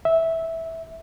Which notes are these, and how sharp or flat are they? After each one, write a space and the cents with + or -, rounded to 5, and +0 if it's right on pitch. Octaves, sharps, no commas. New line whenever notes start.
E5 -10